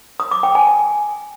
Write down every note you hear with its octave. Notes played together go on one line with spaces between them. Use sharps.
D#6
D6
G5
G#5
G#5